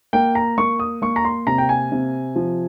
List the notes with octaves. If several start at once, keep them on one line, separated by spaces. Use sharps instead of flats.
A#3 G5
A#5
A#3 C#6
D#6
A#3 C#6
A#5
C6
C3 A#5
G5
G#5
C3
F3